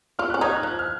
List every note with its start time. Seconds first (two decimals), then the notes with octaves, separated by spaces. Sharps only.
0.19 F4 F6
0.30 C#4 F#6
0.41 D#4 G#6
0.52 F#6
0.63 F3 F#6
0.79 F6